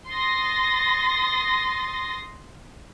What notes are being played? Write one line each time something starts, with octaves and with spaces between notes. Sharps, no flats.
C6 D#6 A6 A#6